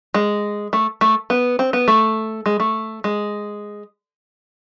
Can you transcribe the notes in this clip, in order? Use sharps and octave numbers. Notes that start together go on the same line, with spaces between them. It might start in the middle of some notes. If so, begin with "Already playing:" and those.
G#3
A3
A3
B3
C4
B3
A3
G#3
A3
G#3